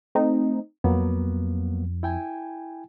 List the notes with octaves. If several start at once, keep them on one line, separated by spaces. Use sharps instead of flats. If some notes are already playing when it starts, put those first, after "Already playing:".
A3 C4 D#4
F2 F#3 A#3 B3
E4 G5 G#5